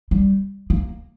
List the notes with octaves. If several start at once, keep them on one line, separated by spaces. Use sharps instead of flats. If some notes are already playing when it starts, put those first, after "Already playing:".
G3
A#3